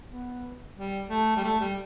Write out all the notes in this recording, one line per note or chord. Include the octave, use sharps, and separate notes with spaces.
B3
G3
A3
G3
A3
G3